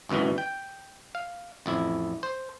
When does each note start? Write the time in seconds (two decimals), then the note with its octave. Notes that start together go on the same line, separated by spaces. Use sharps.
0.09 G#1 C#2 F#2 B2 E3
0.38 G5
1.15 F5
1.66 A1 F2 E4
2.23 C5